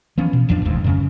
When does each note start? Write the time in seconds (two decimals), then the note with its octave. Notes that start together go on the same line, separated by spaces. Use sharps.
0.18 E3 F3 B3 C#4
0.33 B2
0.49 A1 E2 F3 D4
0.65 F1 D#2 G#2
0.84 F#2 C#3 C#4